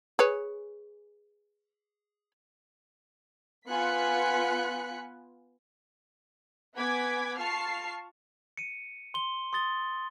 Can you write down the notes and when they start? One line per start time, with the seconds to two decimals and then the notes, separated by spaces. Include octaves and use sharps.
0.19 G#4 B4 C#5
3.67 B3 F4 G#5 F#6 B6 C#7
6.75 B3 F#5 G#5 D6 G#6 B6
7.37 F4 A5 C#6 F6 C7
8.57 C#7 D#7
9.14 C6 G7
9.53 C6 D#6 A6 G7